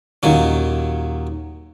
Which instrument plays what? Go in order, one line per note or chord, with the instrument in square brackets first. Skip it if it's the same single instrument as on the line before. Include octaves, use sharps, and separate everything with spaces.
[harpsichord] D#2 A#2 F#3 C#4